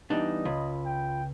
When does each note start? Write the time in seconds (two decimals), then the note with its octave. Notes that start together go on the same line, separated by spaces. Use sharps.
0.10 E3 G3 B3 D4 D#4 D#5
0.45 C#2 F4 B5
0.85 G5